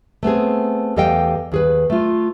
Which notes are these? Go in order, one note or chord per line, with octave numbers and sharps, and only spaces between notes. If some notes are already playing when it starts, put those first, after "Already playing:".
A3 B3 C4 G#4
E2 G4 A4 D#5 F5 G5
D#2 G#4 B4
A3 F4